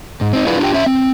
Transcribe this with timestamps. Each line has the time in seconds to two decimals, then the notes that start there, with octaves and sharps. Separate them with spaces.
0.21 G#2
0.33 C4 D#4
0.46 D4 E4 F4 G#4 B4
0.59 D4 F4 G4 G5
0.74 C#4 E5
0.86 C4